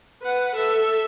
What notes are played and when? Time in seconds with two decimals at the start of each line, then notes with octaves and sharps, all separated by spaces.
0.23 B4 F#5
0.56 A4 E5